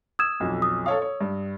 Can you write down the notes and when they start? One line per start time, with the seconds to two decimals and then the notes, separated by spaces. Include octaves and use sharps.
0.19 D#6 E6 G#6 E7
0.40 B1 F2
0.62 D#6
0.86 A4 C#5 F5 D#6
1.02 C#5
1.21 G2